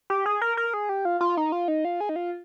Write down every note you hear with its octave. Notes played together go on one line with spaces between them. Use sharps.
G4
G#4
A#4
A#4
G#4
G4
F4
F4
D#4
F4
D#4
F4
G#4
D#4
F4